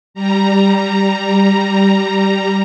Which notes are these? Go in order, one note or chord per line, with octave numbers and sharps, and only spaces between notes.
G3 A#5